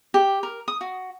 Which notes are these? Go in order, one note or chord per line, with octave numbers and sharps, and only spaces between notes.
G4
A#4
D#6
F#4